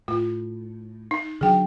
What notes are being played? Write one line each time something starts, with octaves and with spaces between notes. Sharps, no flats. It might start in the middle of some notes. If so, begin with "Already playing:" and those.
A2 F4
D#4
D3 F#3 G#4 G5